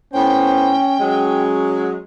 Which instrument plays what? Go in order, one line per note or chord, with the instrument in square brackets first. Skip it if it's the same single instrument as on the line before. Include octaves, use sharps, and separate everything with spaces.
[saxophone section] A2 B3 C5 [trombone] C#4 [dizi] G5
[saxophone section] F#3 G#3 [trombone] C#4